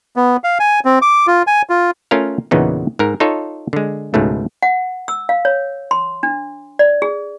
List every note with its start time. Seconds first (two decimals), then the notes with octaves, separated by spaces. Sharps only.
0.16 B3
0.44 F5
0.60 G#5
0.85 C4
1.02 D6
1.27 F4
1.47 G#5
1.69 F4
2.11 A3 C#4 F4 A#4 F5
2.51 E2 A#2 C#3 E3 B3 D#4
2.99 G#2 A#4
3.20 D#4 F4 A4 C#5
3.73 D3 G#3
4.14 C#2 G#2 B2 A3
4.63 F#5
5.08 E6
5.29 F5
5.45 C#5
5.91 C6
6.23 D4
6.79 D5
7.02 G#4